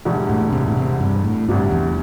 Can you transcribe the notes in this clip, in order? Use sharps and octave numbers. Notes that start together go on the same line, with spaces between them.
E1 D2 D3 G3
A2
C3
A2
C3
G2
A2
D2 G2 C3 G3 D4
E2